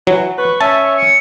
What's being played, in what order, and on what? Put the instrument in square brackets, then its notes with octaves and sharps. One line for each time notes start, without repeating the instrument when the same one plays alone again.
[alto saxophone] E3 [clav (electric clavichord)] F#3
[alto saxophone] B4 [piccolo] C#6
[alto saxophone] C#4 [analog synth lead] E5 [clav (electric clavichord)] A5
[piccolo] C#7